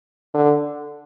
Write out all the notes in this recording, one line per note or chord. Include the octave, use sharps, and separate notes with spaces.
D3